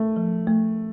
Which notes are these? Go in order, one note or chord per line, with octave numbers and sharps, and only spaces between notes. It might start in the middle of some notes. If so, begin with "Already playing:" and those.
Already playing: A3
F3
A3